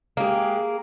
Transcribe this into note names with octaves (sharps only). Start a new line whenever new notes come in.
G#3 A#3 G4 G#4